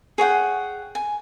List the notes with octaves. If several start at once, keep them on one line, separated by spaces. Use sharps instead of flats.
G#4 C#5 F#5 G5
G#5